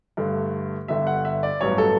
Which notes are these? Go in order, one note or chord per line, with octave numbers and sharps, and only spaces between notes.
G2 D3 A3
G1 G2 D3 G3 E5
F#5
E5
D5
A1 G2 F#3 B3 C#5
A4